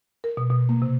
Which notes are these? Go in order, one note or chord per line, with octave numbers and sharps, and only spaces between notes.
A#4
B2
B2
A#3
C3